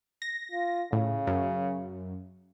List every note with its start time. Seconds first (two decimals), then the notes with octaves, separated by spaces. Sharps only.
0.22 A#6
0.52 F4
0.93 A2 C#3
1.27 F#2